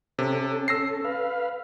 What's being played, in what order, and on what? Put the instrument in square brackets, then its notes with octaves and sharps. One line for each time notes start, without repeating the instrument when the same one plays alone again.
[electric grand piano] C3 [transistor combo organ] C#4 A4
[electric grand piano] E6 A#6 C7
[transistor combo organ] B4 F5